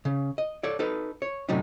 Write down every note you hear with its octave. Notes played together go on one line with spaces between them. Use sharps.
C#3
D#5
A4 C#5 D5
D#4 A4 B4
C#5
F#2 A2 C3 F#3 D4 D#4